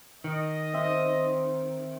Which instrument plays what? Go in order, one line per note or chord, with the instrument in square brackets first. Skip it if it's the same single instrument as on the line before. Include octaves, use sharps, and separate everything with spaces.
[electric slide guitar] D#3 [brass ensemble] D#5
[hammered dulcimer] C4 E5